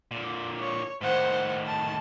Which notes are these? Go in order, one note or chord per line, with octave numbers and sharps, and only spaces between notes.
A#2 D3
C#5
A2 D#3 C5 F#5
A5